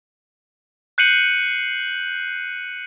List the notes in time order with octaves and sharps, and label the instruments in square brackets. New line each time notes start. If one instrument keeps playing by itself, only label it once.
[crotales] F#6 G6 C7 C#7 D#7 F#7